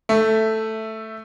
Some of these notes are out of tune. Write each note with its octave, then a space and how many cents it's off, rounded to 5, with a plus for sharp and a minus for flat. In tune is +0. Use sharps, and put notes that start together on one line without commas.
A3 +5 E5 +0